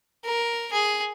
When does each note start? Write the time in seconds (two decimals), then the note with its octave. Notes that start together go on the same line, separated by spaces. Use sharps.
0.24 A#4
0.72 G#4